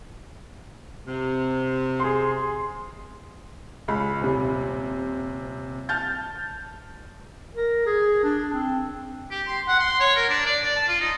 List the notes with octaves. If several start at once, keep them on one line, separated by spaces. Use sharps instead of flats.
C3
G#4 C6
C#2 B5
D#1 C3
A5 F6 G6 A6
A#4
G#4
D4
C4
G4
C6
F#5
C6
C#5
A#4
D4
D5
D5
A5
F4
D#4